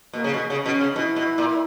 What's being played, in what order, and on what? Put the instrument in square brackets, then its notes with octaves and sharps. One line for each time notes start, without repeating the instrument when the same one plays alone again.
[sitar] B2 [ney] A#3
[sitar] C#3
B2
C#3
[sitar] B2 [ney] C#4
[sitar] C#3
[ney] D4
[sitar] B2 [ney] E4
[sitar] B2
A#2
[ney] E4